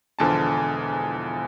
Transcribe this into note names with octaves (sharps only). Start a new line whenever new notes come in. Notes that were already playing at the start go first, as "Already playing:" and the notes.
E1 E2 D3 F3 A5